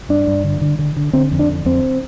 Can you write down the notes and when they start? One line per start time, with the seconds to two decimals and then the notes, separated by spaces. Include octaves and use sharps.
0.09 G2 D4
0.27 G2
0.44 D3
0.61 D3
0.79 D3
0.97 D3
1.13 D3 C4
1.32 F2
1.39 D4
1.49 D3
1.66 F2 C4